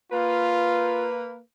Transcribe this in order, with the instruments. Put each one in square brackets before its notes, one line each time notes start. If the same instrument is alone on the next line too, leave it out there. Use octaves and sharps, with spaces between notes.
[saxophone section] A#3 B4 [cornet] F4